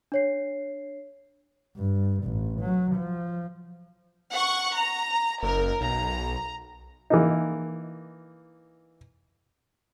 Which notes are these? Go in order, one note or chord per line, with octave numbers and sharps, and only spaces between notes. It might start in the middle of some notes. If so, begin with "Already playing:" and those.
D4 C#5 C7
G2
A1
F#3
F3
F#5 C#6
A#5
F#1 A#4
B1 A#5
E3 A#3 D#4